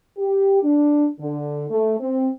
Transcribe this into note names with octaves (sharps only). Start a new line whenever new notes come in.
G4
D4
D3
A3
C4